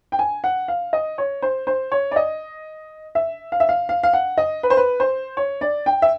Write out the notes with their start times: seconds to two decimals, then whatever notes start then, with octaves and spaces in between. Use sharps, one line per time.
0.12 G5
0.19 G#5
0.44 F#5
0.68 F5
0.93 D#5
1.18 C#5
1.42 C5
1.67 C5
1.92 C#5
2.11 D5
2.16 D#5
3.15 E5
3.52 F5
3.60 E5
3.69 F5
3.89 F5
4.03 F5
4.13 F#5
4.38 D#5
4.63 B4
4.70 C5
4.77 B4
5.00 C5
5.37 C#5
5.61 D5
5.86 G5
6.02 E5